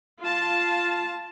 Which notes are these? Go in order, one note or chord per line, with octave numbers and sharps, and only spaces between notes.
F4 A5